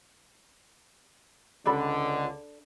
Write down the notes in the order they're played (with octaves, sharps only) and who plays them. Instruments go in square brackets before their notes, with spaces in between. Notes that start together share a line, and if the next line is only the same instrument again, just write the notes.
[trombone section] C#2 D3 [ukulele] D4 A4 B5